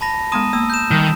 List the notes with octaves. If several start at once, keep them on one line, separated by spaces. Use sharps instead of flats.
A5 B5 A#6
G#3 B3 A#5 C6 D#6 D#7
A#3 E6
G6 E7
D#3 G3